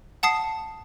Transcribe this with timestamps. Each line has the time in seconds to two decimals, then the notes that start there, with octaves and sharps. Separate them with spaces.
0.23 F#5 A5 D#6 C7